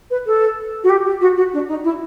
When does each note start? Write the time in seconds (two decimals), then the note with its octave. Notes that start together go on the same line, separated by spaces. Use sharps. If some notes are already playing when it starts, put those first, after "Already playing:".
0.10 B4
0.26 A4
0.83 F#4
0.89 G4
1.05 G4
1.20 F#4
1.36 F#4
1.53 D4
1.68 D#4
1.83 E4